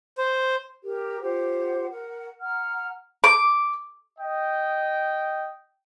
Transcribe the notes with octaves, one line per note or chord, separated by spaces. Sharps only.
C5
G4 A#4
F4 G4 C5 F#5
A#4 F#5
F#5 A#5 F6
D6
D#5 G5